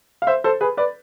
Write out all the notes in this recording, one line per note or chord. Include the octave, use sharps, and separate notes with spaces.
F5
C5 E5
A4 C5
G#4 B4
B4 D5